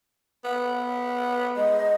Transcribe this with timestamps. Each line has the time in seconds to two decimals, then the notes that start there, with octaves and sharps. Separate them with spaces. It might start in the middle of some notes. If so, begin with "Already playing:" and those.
0.44 B3
1.56 G#3 D#5